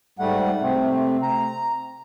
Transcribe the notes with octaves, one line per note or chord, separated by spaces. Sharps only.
G#2 G3 A3 F#5
C3 A3 C4
A#5